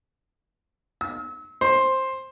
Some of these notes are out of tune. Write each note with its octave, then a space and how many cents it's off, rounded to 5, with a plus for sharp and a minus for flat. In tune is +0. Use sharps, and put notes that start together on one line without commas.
E6 -35
C5 +10